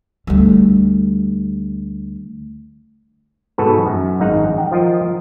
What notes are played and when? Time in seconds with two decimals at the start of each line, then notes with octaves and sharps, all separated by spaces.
0.27 D2 G3
3.58 G#2 B2 F#4 A4 B4
3.87 F#2
4.20 G#1 G#2 D#4 F5 F#5 A#5
4.58 F#5 G5
4.71 F3 F4 A#4 D#5